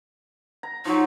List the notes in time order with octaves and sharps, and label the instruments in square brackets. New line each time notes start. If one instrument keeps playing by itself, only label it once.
[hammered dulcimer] A#5
[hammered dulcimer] F3 F#3 [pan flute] D#4